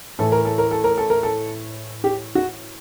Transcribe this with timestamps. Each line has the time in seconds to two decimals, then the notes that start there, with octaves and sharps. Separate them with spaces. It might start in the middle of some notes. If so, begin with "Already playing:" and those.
0.19 A2 E3 A4
0.32 A#4
0.45 A4
0.58 A#4
0.71 A4
0.84 A#4
0.98 A4
1.10 A#4
1.23 A4
2.04 G4
2.35 F#4